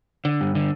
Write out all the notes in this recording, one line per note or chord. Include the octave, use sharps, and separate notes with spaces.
D3
G2
D3